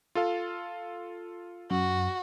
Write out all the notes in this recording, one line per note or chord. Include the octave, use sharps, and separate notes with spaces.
F4 A4 F5
F#2 F#4